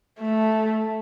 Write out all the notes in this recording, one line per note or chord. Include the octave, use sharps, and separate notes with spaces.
A3